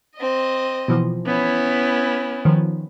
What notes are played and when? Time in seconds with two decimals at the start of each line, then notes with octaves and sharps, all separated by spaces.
0.16 C4 D#5
0.88 B2 E3 F3
1.27 B3 C#4 E4
2.45 D#3 F3